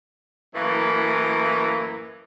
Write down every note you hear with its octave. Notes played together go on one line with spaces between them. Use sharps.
F#2 A2 E3 A#3